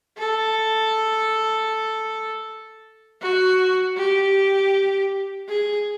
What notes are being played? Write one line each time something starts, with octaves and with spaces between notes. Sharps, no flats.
A4
F#4
G4
G#4